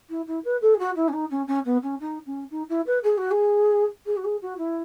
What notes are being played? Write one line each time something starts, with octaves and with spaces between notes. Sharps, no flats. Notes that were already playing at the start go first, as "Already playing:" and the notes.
E4
E4
B4
A4
G#4
F#4
E4
C#4
D#4
C#4
C#4
B3
C#4
D#4
C#4
D#4
E4
B4
G#4
F#4
G#4
G#4
F#4
G#4
F#4
E4